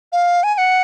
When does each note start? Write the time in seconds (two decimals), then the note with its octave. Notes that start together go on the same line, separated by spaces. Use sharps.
0.12 F5
0.43 G#5
0.55 G#5
0.58 F#5